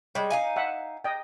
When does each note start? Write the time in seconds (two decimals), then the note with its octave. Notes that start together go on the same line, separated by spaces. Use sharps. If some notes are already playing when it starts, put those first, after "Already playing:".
0.15 G3 G#3 C#5
0.30 D#4 F5 G#5
0.56 E5 F#5
1.04 D#5 G5